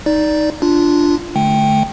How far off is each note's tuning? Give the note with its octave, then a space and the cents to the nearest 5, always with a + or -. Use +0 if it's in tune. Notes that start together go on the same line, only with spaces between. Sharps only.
D#4 +0 D5 +0
D4 +0 F4 -15
D3 +10 A3 -30 G5 +0